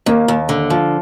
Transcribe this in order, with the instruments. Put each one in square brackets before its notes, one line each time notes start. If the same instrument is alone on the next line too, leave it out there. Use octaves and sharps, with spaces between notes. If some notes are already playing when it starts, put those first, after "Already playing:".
[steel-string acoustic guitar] D#2 [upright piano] A#3
[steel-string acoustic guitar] D#2
D3
F3